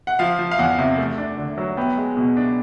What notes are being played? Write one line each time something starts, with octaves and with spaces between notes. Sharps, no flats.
F#5
F3 F5
F3
F5
E2 F#5
C3
A3
D4
D3
F#3
B3 G5
G#3
B2
D4